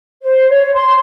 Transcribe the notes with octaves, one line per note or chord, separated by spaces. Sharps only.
C5
C#5
C6